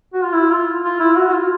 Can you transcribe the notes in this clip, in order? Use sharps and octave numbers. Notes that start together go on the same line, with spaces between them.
F#4
F4
E4
F4
F4
E4
F#4
F#4
F4